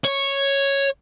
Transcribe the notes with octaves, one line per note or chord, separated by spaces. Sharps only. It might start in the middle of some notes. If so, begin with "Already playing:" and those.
C#5